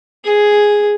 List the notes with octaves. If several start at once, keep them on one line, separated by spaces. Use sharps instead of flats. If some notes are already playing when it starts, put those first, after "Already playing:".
G#4